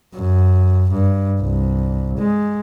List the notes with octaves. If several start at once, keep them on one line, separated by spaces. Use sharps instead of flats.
F#2
G2
C2
G#3